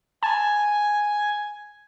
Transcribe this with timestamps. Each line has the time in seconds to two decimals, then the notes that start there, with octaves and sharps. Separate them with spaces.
0.23 G#5 A5